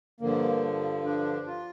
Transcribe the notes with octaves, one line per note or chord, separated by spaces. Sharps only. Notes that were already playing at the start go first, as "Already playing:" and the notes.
G2 D3 F3 A#3
D4
F4